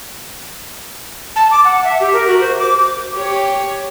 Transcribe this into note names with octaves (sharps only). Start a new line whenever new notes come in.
A5
D6
F#5
E5
G4
A#4
F#4
C5
D6
G4 C#5